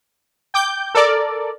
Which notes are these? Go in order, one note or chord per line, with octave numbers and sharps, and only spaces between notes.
G5 D6 G6
A4 A#4 D5